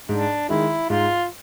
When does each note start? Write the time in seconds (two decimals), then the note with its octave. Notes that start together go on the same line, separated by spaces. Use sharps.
0.09 G#2 D4
0.49 D#3 G#3 E4
0.89 G#2 F4